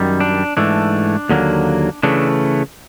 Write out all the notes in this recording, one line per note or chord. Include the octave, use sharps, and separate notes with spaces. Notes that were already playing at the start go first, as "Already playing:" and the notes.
Already playing: F#2 D#3 G3
D4
G#2 E3 A3 D4
D#2 D3 F#3 A#3
C#3 E3 A3 D4